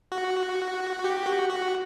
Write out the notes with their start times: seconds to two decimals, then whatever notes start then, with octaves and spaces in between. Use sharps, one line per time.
0.12 F#4
1.04 G4
1.26 F#4
1.50 F#4